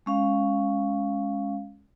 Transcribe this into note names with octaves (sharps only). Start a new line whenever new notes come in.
G#3 C#4 F5